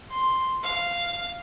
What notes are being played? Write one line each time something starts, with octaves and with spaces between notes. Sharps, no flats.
C6
F5